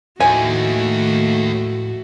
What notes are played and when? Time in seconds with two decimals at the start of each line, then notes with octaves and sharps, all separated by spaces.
0.20 D#2 A2 F3 A3 E4 F#4 G#5